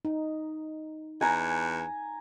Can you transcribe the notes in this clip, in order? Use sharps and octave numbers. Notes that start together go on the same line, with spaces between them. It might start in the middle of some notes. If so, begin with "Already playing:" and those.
D#4
E2 G#5 A#5